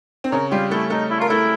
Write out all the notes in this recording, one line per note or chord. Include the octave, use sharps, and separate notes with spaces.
C4
C#3 C#4 A#4
G3 F4 G4
A3 E4 A4
A3 D#4 A4
E4
F4 A#4
A3 E4 A4